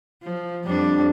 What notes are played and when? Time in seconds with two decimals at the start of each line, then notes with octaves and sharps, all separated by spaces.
0.24 F3
0.66 F2 G3 D4